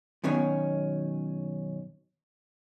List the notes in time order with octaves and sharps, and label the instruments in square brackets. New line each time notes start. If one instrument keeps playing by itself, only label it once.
[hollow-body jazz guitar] F#2 B2 D#3 C#4